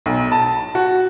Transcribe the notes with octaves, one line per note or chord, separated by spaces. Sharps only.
B1
A5
F#4